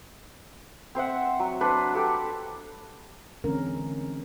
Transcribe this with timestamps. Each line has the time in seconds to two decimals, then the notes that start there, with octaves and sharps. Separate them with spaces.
0.95 C4 C5 E5 F#5
1.40 F#3
1.61 D4 B4 C5
1.93 G4 A4 D5
3.44 D3 E3 G#3 C4 C#4 A#4